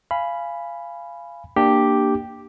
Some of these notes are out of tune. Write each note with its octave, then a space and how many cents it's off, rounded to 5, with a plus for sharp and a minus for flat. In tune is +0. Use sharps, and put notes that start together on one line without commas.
F5 -20 G#5 +0 B5 +0
A#3 +0 D4 +20 G4 +0